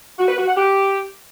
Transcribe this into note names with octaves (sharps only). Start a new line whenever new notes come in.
F#4
B4
F#4
F#5
G4